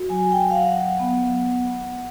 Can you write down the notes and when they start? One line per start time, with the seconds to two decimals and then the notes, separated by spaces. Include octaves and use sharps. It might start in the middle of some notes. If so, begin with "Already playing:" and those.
Already playing: F#4
0.09 F#3 G#5
0.32 G5
0.50 F5
0.55 F#3 F#5
0.99 B3